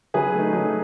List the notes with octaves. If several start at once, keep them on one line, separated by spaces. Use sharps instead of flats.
F#3 G#4 B4
A3 D#4
F#3